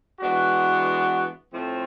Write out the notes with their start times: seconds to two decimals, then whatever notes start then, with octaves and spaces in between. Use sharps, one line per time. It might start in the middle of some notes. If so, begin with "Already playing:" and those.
0.20 E3 G#3 B3 D4 F#4
1.53 A2 F3 A3 C4